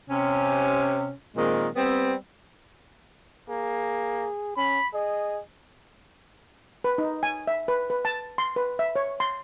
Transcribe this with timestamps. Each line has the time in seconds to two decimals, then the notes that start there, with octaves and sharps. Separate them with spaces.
0.09 C3 C#4
1.37 A#2 D#3 G#3 C4
1.75 G3 B3 C4
3.49 A#3 G#4
4.57 C#4 B5
4.94 G#4 D#5
6.84 B4
6.98 D#4
7.23 G#5
7.47 E5
7.68 B4
7.90 B4
8.05 A5
8.38 C6
8.56 B4
8.79 E5
8.96 C#5
9.20 C6